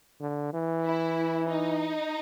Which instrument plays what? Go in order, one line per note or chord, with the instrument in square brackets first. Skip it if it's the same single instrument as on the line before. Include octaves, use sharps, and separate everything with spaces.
[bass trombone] D3
E3
[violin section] E4
D#4